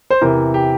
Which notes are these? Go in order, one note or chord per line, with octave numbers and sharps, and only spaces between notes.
C5
E2 C3 E3 A#4
G4